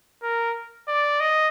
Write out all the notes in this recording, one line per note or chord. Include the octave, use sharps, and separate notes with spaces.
A#4
D5
D#5